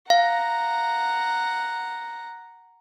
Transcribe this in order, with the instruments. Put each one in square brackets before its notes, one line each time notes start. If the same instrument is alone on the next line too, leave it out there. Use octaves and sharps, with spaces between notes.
[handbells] F5 [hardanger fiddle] F#5 A#5